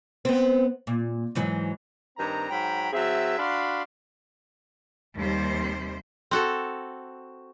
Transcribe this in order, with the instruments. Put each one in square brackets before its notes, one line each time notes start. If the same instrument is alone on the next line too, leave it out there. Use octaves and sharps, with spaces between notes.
[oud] B3 C4
A#2
G#2 E3 F#3
[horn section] G2 D#3 C4 A#5
G#2 F#3 G5 A#5 B5
F#3 C4 G#4 E5
D4 F#4 F5 B5 C6
[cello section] D#2 C3 G3 C5
[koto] C4 F#4 A4